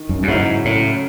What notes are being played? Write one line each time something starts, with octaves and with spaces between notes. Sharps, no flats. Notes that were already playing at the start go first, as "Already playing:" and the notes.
Already playing: D#3
F#2
F#2
G#2 C#3 F#3 C#4 E4
A2